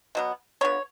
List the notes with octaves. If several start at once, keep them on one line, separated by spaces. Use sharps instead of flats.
B2 F#3 B3
D3 F3 B3 C#5